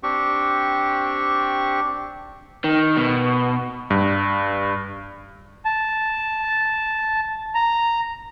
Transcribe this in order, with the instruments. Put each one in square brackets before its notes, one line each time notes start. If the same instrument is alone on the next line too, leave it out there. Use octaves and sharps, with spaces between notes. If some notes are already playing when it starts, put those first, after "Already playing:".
[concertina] C4 D4 G4 C#6
[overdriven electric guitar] D#3
B2
[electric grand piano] G2
[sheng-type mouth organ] A5
A#5